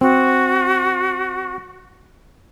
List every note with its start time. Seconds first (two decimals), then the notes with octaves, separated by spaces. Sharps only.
0.01 C4 F#4